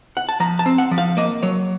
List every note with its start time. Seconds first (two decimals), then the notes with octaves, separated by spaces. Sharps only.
0.17 F#5
0.29 A5
0.40 F3 A#5
0.59 A5
0.66 C4
0.78 F#5
0.91 F3
0.98 F5
1.17 A#3 D#5
1.43 F#3 C#5